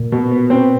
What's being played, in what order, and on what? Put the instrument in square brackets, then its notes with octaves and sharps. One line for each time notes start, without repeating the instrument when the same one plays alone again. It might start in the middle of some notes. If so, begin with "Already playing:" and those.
Already playing: [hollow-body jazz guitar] A#2
[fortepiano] B2
B3
C4